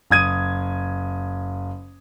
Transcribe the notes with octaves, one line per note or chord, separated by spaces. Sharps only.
F#1 D#6 G#6 D#7